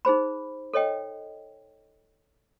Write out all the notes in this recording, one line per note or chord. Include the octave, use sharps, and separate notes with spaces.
D#4 G#4 C5 B5
A4 C#5 D#5 G5